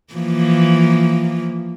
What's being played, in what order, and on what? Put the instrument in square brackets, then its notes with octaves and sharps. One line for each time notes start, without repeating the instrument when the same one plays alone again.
[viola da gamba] E3 F3 A#3